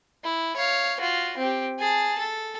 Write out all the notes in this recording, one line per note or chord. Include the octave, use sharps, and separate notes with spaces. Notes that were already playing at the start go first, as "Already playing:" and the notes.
E4
C#5 F5
F4 F#4
C4 G4
G#4 A5
A4